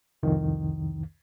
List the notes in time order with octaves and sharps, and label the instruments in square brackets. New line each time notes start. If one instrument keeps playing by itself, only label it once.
[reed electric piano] C2 F2 D#3